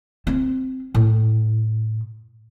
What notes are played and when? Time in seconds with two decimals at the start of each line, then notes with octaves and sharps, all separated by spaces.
0.27 C4
0.95 A2